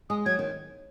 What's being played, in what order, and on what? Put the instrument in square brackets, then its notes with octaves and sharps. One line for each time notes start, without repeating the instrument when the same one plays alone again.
[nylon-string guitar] G#3 [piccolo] D#6
[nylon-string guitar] F#3 [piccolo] G#6
[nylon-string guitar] D#3